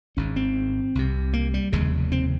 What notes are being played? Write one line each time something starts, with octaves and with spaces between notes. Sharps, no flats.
G#1 G#2 C#4
C4
C2 C3
A#3
G3
F1 D#2 C#3 G#3
C4